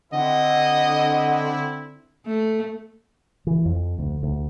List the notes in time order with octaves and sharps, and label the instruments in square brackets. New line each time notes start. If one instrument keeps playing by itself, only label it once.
[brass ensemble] D3 C4 E4 [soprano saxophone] D#5 [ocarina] F#5
[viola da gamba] A3
[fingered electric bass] E3
F2
D2
D2